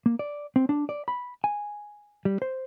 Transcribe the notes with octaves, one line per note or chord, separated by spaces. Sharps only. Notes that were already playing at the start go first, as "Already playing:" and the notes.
A#3
D5
C4
D4
D5
B5
G#5
G3
C5